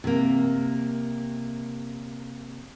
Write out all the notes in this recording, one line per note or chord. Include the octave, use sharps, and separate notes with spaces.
C3 A#3